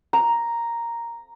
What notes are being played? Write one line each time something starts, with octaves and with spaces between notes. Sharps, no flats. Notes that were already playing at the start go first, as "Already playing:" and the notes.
A#5